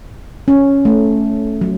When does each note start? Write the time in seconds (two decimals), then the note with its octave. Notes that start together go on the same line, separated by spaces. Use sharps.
0.48 C#4
0.85 A3
1.61 F#3